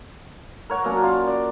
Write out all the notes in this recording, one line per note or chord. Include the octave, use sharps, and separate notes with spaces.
A#4 C#5 F#5
F#3 A#3 C#4 D4
F4
D5